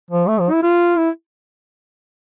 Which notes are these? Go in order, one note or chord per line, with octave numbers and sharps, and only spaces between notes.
F3
A3
F3
E4
F4
E4